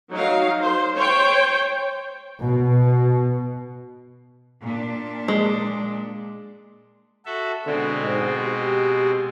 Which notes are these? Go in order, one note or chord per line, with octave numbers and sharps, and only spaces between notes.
F#3 D#4 F5
C5
C5 C#5 G5
B2
A#2 D4
G#3
F#4 A4 E5
B2 D3 G#3 C4
G#2
G4